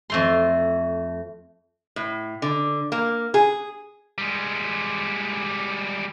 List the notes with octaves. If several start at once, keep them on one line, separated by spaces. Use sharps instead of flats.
F2 A3 C6
A2
D3
A#3
G#4
G3 G#3